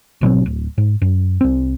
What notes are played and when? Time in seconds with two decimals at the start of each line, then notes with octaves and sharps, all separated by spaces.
0.21 G#1 B2 F#3 C4
0.46 D1
0.78 G#2
1.02 F#2
1.41 C2 C4